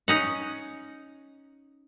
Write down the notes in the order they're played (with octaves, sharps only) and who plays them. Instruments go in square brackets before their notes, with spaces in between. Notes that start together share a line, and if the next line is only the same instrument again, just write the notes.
[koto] C#4 D#4 F#5